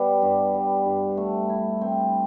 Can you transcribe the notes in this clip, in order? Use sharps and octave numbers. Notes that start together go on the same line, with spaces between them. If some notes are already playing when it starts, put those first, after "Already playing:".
Already playing: G3 B3
G2
G3
G2
A3
E4
C4